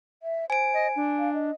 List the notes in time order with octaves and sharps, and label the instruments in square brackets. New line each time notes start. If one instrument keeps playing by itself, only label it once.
[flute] E5
[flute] C5 [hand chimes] G#5 D7
[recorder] D#5
D4
[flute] F5
D#5